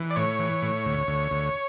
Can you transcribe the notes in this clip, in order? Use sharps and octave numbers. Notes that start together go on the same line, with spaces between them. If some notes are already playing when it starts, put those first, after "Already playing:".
Already playing: E3
D5
A2 C#5
E3
A2
D2
D2
D2